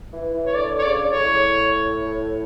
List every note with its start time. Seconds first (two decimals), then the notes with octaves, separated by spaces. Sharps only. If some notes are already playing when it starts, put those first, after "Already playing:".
0.12 E3
0.34 E3
0.46 C#5
0.55 D3 D5
0.79 C#5
0.83 C#3 D5
1.11 A2 C#5